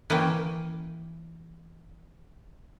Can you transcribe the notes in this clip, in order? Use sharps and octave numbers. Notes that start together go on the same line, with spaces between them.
E3 A#3 C#4 G5